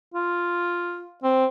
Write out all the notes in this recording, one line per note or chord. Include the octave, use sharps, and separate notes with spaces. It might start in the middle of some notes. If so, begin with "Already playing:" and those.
F4
C4